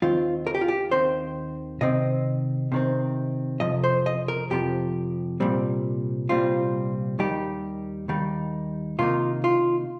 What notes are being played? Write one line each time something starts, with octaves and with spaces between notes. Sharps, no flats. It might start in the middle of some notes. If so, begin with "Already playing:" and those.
D#2 D#3 C4 F4
A#4
G4
F4
G4
D#2 D#3 C4 C5
C3 D#3 C4 D#5
C3 D#3 C4
F2 C3 F3 D#5
C5
D#5
A#4
F2 C3 F3 G4
C2 A#2 G3 C4
C2 A#2 G3 C4 F4
D#2 D#3 G3 D#4 G4
D#2 D#3 G3 D#4
C3 D#3 A#3 D#4 F4
F4